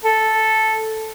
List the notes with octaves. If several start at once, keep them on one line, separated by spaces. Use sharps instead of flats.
A4